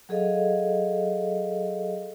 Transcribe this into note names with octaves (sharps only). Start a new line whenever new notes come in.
F#3 G#4 A4 D#5 F5